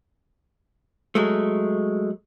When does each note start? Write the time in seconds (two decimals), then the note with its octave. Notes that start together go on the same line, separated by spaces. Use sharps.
1.15 F#3 G#3 A3